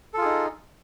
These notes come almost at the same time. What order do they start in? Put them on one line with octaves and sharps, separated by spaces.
A4 F4 G#4 D#4